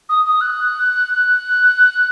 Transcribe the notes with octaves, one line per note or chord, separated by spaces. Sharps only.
D#6
D#6
F#6